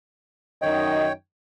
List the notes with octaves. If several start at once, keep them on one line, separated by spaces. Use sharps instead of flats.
F#2 D#3 C#5 D#5 G5